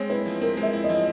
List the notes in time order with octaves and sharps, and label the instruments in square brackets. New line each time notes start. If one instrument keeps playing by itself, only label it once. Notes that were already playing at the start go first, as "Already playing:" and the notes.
Already playing: [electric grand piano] G#3 C4 [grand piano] C#5
[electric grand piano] E4 [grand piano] B4
[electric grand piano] F3
[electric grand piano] C4 [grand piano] A#4
[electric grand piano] G#3
[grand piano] E5
[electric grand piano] E4
[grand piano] D#5
[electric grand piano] F3